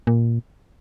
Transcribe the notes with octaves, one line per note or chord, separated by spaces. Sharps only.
A#2